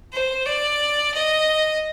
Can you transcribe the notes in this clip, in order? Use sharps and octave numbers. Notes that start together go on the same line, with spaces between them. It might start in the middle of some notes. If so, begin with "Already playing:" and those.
C5
D5
D#5